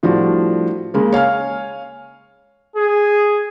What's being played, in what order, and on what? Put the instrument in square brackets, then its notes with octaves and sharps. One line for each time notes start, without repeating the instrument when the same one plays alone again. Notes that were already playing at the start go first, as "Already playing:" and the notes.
[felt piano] A2 F3 G3 D4 F#4
C#3 G#3 A#3
C#5 F5 G#5 F6
[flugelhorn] G#4